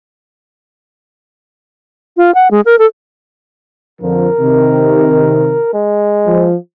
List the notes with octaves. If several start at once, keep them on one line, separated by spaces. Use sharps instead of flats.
F4
F#5
G#3
A#4
A4
F2 D3 F3 A#4
C3 D#3
G#3
F3